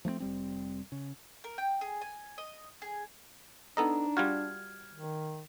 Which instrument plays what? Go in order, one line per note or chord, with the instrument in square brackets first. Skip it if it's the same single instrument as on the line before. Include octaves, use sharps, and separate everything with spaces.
[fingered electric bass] F3 A3 A#3 C4
F1 G3 C4
C#3
[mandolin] A#4
G5
G#4
G#5
D#5
G#4
[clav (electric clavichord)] B3 A4 D#5 [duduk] D4 [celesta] D#4 A#5
[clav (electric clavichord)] G3 F4 F#4 [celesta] F6 G#6
[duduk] D#3